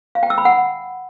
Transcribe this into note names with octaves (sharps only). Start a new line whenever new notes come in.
F5
G5
E6
B5
F#5